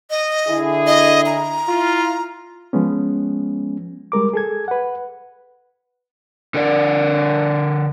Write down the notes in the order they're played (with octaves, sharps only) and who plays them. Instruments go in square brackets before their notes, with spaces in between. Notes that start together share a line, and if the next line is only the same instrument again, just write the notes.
[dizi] D#5
[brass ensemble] D3 E4 G#4
[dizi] D#5
A#5
[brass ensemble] E4 F4
[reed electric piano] F3 G#3 B3 C#4
G3 G#3 A#4 D6
G#4 A4 G#6
B4 F#5
[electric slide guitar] D3 A#4 D5